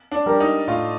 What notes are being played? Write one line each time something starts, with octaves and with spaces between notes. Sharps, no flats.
D4
G3 D4 G4 A#4
D#4
A2 F4